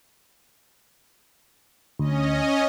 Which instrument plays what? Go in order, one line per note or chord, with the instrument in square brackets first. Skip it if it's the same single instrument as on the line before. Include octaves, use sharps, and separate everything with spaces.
[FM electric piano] D2 [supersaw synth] C#4 D#5